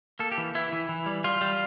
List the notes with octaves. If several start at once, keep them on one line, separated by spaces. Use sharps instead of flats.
A#3 A4
G4
E3
E3 E4
E3
E3
G3
G3 F4
G3